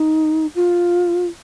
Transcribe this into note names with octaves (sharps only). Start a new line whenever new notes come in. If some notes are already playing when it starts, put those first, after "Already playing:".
Already playing: D#4
F4